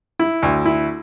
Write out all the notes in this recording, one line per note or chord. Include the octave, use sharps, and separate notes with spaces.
E4
D2
E4